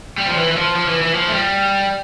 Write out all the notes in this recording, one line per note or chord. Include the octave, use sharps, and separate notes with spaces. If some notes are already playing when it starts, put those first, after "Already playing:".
G3
F3
E3
E3
F3
F3
E3
E3
F3
A3
G3